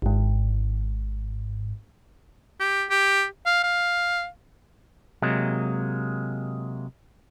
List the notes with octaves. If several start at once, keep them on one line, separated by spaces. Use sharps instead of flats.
G#1 G#2
G4
G4
F5
F5
C3 F#3 G#3 A#3